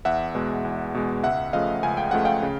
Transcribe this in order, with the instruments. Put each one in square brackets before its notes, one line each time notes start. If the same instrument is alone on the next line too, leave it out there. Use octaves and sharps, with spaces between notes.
[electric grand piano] E2 E5 F#5
B2 G#3
E2
B2 G#3
C#2 E5 F#5
C#3 F3 A3 D#5 F5
C#2 G#5
G5
C#3 F3 A3 F#5
F5 G5
C#3